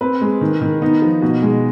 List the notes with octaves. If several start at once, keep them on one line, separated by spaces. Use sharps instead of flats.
C4 B4
G#3
D#3
D#3
B3 D#4
F3
B2
G#3